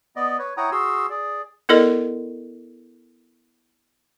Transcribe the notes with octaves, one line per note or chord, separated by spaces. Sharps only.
B3 D5 D#5
B4 C#5
E4 C#5 F#5 G5 A#5 D#6
F#4 G#4 C6 E6
G#4 D5
B3 E4 A4 A#4 D5 D#5